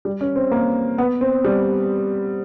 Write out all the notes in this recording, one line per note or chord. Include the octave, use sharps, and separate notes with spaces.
G3
C#4
C4
A#3
B3
C4
G3